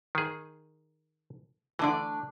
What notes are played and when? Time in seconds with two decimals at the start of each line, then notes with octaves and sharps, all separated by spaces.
0.15 D#3 G#4
1.79 D3 E3 A3 D4 D5